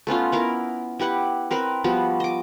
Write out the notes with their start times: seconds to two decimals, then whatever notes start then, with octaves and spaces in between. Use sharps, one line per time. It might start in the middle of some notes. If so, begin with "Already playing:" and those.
0.07 A3 B3 C#4 F4
0.32 B3 E4 A#4
0.99 E4 G4 B4 F#5
1.51 C4 A#4 B4 B5
1.84 F3 G3 B3 F#4
2.20 D#5 D6